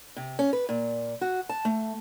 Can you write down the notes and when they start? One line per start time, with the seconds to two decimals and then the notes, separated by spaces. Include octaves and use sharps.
0.17 C3
0.39 C#4
0.53 B4
0.69 A#2
1.21 F#4
1.49 A5
1.65 A3